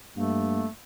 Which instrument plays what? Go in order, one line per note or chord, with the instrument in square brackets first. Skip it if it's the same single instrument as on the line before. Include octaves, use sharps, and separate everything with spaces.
[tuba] G2 [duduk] A3 [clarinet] A#3